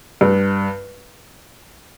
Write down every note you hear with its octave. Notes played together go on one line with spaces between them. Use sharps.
G2